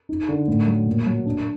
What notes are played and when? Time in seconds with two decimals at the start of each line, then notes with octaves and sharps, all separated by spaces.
0.09 D#4
0.28 D3
0.48 A2
0.67 F#3
0.86 A#2
1.06 F#3
1.26 D4